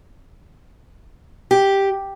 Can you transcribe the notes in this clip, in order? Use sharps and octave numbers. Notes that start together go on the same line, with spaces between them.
G4